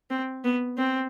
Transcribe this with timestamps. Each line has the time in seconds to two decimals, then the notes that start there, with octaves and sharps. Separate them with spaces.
0.10 C4
0.44 B3
0.78 C4